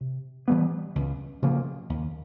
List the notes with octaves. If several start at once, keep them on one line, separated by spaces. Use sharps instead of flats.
C3
E3 G3 B3
C#2
C#3 F3 A#3
D#2